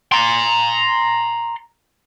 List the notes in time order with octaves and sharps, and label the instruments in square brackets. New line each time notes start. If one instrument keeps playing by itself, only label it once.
[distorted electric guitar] A#5 C6